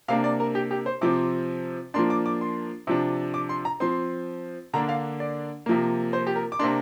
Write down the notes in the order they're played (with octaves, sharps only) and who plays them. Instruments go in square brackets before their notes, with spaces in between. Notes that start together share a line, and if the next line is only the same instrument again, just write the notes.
[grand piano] C3 A#3 D4 F5
D5
A#4
G4
G4
C5
C3 F3 C4 D6
F3 A#3 D4 C6
D6
D6
C6
C3 F3 D4
D6
C6
A#5
F3 C4 C6
D3 A#3 D4 A#5
F5
D5
C3 F3 A#3
C5
G4
A#4
D6
C3 A#3 D4 C6